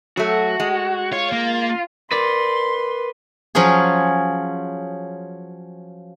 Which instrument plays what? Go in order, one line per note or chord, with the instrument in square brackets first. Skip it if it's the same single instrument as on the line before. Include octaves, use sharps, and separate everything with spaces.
[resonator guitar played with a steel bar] F#3 A3 [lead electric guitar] F#4
[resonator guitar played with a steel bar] G#3
[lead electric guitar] F4 [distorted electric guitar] C#5
[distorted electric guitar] A#3
[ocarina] A#4 [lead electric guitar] B4 D5 [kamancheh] C6
[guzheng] F3 F#3 C#4 F4 G#4